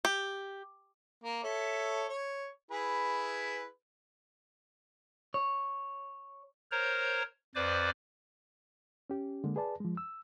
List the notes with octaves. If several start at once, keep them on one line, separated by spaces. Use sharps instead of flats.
G4
A#3
A4 C#5 E5
C#5
E4 G#4 B4
C#5
A#4 C5 C#5 A#5
F2 B4 C5 D5 D6
C#4 G4
D3 G#3 A#3
G#4 B4 D5 A5
F3 G#3
E6